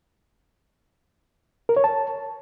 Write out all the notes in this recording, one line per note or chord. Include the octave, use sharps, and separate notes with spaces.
A#4
C#5
A5